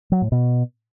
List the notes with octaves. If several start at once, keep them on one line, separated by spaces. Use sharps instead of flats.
F#3
A2
B2